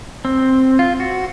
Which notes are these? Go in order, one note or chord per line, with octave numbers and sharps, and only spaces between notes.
C4
F4
F#4